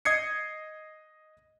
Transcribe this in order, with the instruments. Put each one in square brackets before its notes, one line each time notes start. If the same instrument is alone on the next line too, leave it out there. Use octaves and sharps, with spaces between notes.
[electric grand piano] D#5 D#6 G#6 C7 C#7